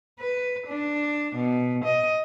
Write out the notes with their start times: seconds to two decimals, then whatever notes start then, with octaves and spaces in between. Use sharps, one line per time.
0.20 B4
0.67 D4
1.36 B2
1.85 D#5